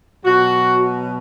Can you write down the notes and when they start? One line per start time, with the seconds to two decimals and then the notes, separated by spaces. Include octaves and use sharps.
0.25 B2 F#3 F#4